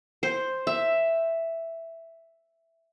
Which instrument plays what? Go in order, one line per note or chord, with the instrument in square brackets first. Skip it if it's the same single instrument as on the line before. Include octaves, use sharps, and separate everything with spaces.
[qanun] C5
E5